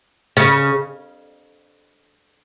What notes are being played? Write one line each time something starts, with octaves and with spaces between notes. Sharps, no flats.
C#3